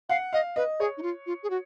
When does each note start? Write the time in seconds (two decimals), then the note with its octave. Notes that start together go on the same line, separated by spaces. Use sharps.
0.09 F5 F#5
0.33 D#5 F5
0.56 B4 D#5
0.80 G#4 C#5
0.97 D#4
1.03 F4
1.26 F4
1.43 G#4
1.50 F#4